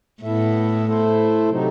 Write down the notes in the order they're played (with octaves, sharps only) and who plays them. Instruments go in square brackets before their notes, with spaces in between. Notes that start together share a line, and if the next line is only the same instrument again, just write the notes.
[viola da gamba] A2 [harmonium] B3 E4 A4 E5
[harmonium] A3 E4 A4 C5
C3 F#3 A3 D#4